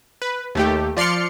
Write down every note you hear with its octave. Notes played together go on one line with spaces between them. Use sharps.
B4
D#2 A3 G4
F3 D5 C6 F6 C#7